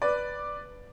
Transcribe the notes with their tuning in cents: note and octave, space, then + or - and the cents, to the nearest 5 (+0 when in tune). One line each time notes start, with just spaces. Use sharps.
B4 +0 D5 +0